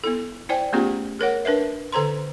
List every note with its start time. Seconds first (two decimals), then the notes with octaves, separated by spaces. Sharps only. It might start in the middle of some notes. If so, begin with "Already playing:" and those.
0.04 B3 E4 A4
0.49 E4 C5 D5 G5 G#5
0.73 A3 B3 C#4 F4 G4 G#4
1.19 G#4 A#4 C#5 F#5
1.45 D4 A#4 B4 E5
1.92 D3 A4 C5 A#5 C6